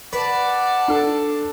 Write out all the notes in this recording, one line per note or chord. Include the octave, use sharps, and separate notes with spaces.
B4 D5 F#5 A5
D4 A4